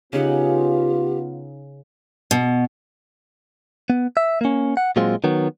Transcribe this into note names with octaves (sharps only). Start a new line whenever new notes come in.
C#3 B3 D#4 F4 G4 F#5
B2
B3
E5
A#3 C#4
F#5
A#2 F#3 G#3 C4 F4
D#3 F#3 B3